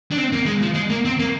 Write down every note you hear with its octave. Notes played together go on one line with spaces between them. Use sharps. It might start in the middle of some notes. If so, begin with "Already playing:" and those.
D4
C4
A#3
G#3
F3
G#3
A#3
C4
A#3